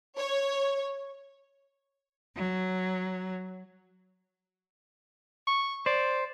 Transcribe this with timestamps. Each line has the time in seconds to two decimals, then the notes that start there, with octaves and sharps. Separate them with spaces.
0.17 C#5
2.35 F#3
5.47 C#6
5.86 C5 D5